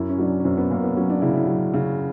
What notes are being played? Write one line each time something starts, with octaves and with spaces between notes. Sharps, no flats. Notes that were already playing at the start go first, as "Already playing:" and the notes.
Already playing: F#2 E4
C#4
F#3 D4
C#4
C#4
F#2 C4
B3
F#2 A#3
B3
F#3 C#4
D4
C#3 E4
E4
F#3
C#3